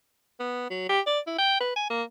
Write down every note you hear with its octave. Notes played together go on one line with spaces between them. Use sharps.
B3
F#3
G4
D5
E4
G5
B4
G#5
A#3